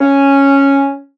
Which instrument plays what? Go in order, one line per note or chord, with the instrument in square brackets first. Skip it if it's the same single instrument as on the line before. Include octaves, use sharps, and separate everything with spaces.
[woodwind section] C#4